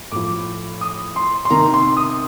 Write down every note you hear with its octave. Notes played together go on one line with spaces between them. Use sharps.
A2 F3 D6
D#6
C6
C6
C3 D#3 A#5
C6
D#6